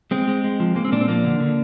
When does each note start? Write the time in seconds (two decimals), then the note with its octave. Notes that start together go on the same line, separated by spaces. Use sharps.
0.11 G#3 C4
0.28 G#3
0.44 G#3
0.60 F3
0.75 G#3 A#3
0.85 C4
0.92 A#2 A#3 D4
1.01 C4
1.08 F3 A#3 D4
1.24 D3
1.40 D3